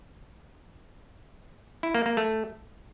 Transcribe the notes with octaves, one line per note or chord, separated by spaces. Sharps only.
E4
A#3
A#3
A3